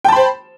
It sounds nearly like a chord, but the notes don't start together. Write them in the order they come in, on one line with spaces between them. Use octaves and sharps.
G5 A5 B5 C5